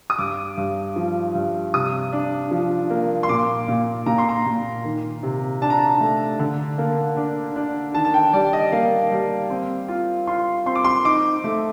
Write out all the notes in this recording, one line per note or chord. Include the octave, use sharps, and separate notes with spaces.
D#6
G2 D6
G2
F3
G2
C3 D#6
D4
F3
A#3
C6
A#2 D6
A#2
A#2 A#5
C6
A#5
A#2
D#3
C3
D4 A5
A#5
A5
A3
D3
A#3
D4
D4
D#3 A5
A5
G5
G3 D5
D#5
A#3 F5
G3
C4
F4
F4 C6
C4 C6
D6
C6
D#4 D6
A3